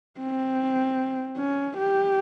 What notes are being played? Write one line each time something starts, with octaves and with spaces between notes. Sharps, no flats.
C4
C#4
G4